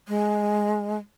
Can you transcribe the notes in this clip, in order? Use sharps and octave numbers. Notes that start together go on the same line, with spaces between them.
G#3